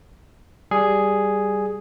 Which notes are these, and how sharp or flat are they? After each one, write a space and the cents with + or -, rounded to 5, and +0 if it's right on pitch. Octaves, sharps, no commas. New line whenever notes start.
G3 +0 G#4 +0